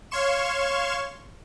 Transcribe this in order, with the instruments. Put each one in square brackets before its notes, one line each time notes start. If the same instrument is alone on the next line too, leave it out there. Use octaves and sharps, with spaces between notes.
[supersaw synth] C#5 F5 C6 C#6 E7